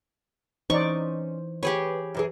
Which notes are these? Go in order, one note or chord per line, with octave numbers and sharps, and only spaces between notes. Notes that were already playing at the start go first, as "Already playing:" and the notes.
E3 C#4 D#4 C5 D5 C#6
G4 G#4 B4 C#5
F#2 E3 G#4